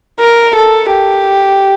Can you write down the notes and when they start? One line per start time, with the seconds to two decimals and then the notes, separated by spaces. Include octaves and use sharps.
0.20 A#4
0.56 A4
0.92 G4